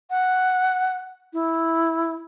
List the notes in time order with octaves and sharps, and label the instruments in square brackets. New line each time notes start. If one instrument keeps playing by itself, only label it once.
[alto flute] F#5
E4